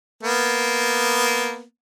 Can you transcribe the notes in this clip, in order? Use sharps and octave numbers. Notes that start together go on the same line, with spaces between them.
A#3 B3